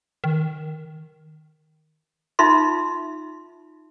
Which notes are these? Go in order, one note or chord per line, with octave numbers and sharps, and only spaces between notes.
D#3
D#4 F4 E5 C6